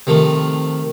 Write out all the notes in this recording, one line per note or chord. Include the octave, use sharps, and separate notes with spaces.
C3 D#3 F3 A3